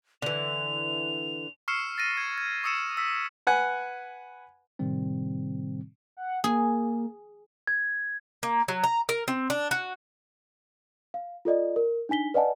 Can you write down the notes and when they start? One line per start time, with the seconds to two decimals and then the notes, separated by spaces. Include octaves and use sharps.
0.22 D3 E3 F7
1.68 C#6 E6 F6 C7 C#7 E7
1.98 A6 A#6 D#7
2.17 G#6
2.38 G#6
2.64 C#6 D#6 E6 C#7 E7
2.97 E6 B6
3.47 B4 F#5 G#5
4.79 A2 C3 D#3 G3 C4
6.17 F#5
6.44 A#3 G#4
7.67 G#6
8.43 A#3
8.68 F#3
8.84 A#5
9.09 A#4
9.28 C4
9.50 D4
9.71 F#4
11.14 F5
11.45 F4 A4 D5 D#5
11.76 A#4
12.09 D4 D#4 G#5 B6 G7
12.34 B4 D5 D#5 F#5 G#5 A5